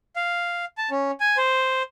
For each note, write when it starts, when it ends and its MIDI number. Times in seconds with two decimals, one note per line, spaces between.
0.16 0.65 77
0.78 0.90 81
0.91 1.11 61
1.20 1.37 80
1.37 1.82 72